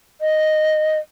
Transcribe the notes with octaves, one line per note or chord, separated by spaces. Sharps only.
D#5